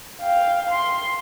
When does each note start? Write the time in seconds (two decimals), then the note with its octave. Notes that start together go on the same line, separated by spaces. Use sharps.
0.21 F5 G5
0.71 C6